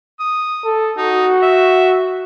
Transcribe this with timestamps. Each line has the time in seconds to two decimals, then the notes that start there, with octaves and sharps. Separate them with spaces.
0.20 D#6
0.65 A4
0.97 D#4 F#4
1.42 E5